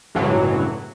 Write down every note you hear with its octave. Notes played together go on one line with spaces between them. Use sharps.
G1 C#2 A2 E3 F#3